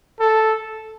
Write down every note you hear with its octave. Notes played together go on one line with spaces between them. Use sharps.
A4